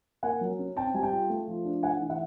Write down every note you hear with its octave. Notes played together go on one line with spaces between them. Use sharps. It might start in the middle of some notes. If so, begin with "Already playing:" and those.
A#3 F#5 G#5
F#3
C#4
C4 G5 A5
G3 G#5
G5 A5
F4
A3
F3
D4
A3 F#5 G#5
E3
E5 F#5